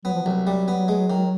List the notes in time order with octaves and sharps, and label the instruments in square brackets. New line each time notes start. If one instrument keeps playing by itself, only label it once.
[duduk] F#3 [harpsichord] B3
[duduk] F3
[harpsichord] C2 [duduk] F#3
[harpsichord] G3
B3
G#3
D#3